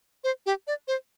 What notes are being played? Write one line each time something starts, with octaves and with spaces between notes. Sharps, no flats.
C5
G4
D5
C5